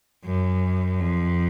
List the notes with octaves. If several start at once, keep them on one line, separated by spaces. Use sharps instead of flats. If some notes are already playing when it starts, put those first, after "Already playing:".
F#2
F2